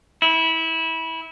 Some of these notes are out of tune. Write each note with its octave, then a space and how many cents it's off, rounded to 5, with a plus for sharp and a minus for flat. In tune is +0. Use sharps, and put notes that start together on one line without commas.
E4 -20